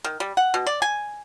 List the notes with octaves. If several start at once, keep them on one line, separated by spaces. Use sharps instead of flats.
D#3
G3
F#5
B2
D5
G#5